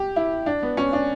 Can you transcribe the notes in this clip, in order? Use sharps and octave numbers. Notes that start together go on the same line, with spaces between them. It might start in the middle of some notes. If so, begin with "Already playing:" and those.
Already playing: G4
E4
D4
B3
C#4
D4